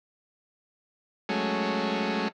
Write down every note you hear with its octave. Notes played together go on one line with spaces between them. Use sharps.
F#3 G#3 A3 C#4